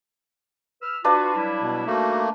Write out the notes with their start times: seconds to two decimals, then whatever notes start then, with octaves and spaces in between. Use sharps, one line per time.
0.81 B4 E6 F6
1.04 D4 F4 F#4 B4 F5
1.34 F#3 G3 E4
1.61 B2
1.86 G3 A3 A#3 D#4 F#4